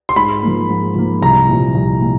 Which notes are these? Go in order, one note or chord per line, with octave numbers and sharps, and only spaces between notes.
C6
G#2 B5
F3 A#3
G#2
F3 A#3
C2 A#5
A#2 F3
C2
A#2